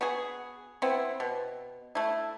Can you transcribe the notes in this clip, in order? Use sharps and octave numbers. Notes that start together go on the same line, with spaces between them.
B3 F#4 G#4
B3 C4 E4
B2
A3 E4